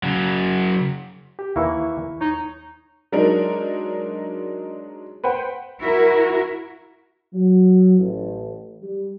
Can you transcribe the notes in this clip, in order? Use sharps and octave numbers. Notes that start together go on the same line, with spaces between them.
C#3 F#3
G4
D#2 E3 A#3 E4 C#6
D#4 C#5
F#3 G#3 D4 D#4 A#4
B4 C5 F#5 G5
E4 F#4 A#4
F#3
A1
G3